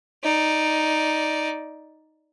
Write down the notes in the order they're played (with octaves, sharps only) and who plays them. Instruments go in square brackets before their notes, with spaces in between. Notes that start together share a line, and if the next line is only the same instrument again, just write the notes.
[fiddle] D#4 D5